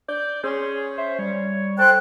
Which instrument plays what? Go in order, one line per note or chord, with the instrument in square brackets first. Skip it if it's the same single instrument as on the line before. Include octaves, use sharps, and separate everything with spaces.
[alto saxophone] D5 [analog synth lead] G6
[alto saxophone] C#4 [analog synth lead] G#4 [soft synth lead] C6
[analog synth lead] C5 [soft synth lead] E5
[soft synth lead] G3 [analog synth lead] C#5
[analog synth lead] A4 [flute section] C5 G5 F#6